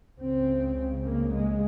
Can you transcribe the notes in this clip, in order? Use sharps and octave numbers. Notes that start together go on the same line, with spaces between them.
C#2 C#3 C4
A#3
G#3